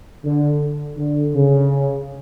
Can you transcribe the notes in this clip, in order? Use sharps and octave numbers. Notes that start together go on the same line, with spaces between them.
D3
D3
C#3